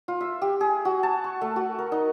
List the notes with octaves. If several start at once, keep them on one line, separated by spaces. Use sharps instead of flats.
F4
E5
G4
G#4
F#4
A5
C#6
A3
F#4
A#4
D#4